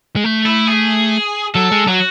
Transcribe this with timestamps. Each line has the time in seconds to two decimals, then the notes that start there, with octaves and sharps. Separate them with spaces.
0.16 G#3
0.24 A3
0.46 E4
0.67 G#4
1.54 F#3 A4
1.72 G#3
1.87 F#3 F#4